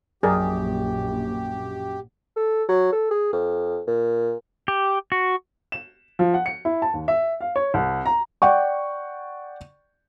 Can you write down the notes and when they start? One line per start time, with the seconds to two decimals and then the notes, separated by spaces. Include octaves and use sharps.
0.23 A#1 F#2 G4 G#4 A#4 D5
2.36 A4
2.69 F#3
2.92 A4
3.11 G#4
3.32 F2
3.87 A#2
4.68 G4
5.12 F#4
5.72 E7
6.19 F3
6.34 F#5
6.46 C#7
6.65 E4
6.82 A5
6.93 D#2
7.08 E5
7.41 F5
7.56 C#5
7.74 C2
8.06 A#5
8.42 D5 F#5 G5 C#6